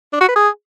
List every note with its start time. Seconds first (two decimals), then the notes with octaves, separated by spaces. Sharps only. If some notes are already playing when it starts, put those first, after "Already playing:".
0.13 D4
0.21 F#4
0.28 B4
0.36 G#4